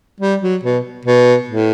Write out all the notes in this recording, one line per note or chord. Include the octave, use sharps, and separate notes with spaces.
G3
F#3
B2
B2
A2